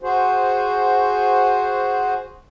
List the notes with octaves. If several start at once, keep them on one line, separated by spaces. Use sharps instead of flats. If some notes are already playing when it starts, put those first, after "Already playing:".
F#4 G#4 C5